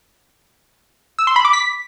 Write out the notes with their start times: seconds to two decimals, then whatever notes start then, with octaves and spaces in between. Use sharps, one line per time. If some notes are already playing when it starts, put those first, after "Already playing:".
1.19 E6
1.27 C6
1.36 B5
1.45 D6
1.53 B6